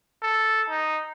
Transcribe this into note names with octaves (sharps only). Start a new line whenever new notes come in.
A4
D#4